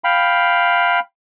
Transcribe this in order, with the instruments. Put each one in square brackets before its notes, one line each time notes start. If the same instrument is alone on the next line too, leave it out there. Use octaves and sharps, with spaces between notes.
[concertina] F5 G5 B5